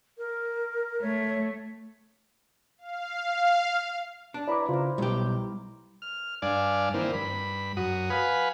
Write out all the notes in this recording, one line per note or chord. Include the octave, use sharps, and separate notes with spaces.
A#4
A3 C#5
F5
D4
E4 B4 C#5 D5 A#5 D6
C#3 F4 A#4 C5
B1 G3 G4
F6
G2 D4 D5 F5 G#5
D#3 E3 A#3 C4
G2 B5
F#2 F#4 D#6
B4 F5 F#5 G#5 B5